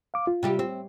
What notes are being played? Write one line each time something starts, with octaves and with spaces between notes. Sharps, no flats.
F5 D6
F4
C3 G3 G4
C4